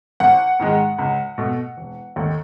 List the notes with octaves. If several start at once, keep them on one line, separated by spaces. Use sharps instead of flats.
A1 F#5
G#2 D#3 G#3
C#2
B2 A3
E1
D#2 D#3 A3